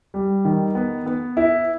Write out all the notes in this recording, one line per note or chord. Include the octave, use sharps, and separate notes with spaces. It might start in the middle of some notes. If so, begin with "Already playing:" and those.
G3
D#3
B3
B3
E4